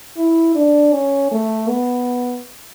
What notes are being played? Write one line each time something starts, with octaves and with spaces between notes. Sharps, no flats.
E4
D4
C#4
A3
B3